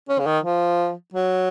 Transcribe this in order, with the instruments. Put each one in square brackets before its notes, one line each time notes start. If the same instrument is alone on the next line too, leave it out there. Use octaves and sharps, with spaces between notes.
[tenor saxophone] C#4
C#3
D#3
F3
F#3